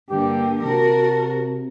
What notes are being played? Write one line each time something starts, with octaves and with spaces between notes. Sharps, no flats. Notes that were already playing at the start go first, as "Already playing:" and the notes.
G2 D3 A#3 G4
C3 F#4 A#4 A5